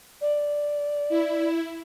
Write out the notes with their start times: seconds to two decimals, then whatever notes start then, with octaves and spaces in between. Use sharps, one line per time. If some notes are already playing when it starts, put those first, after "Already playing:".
0.21 D5
1.09 E4